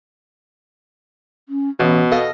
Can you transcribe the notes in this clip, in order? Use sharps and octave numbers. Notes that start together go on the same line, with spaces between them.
C#4
A1 B2 B3
A4 D#5 F5